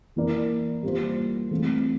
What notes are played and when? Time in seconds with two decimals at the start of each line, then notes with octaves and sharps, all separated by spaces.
0.16 E3 A#3 E4 A#4 D5
0.83 G3 A#3 F4 C5
1.51 E3 A3 C4 F4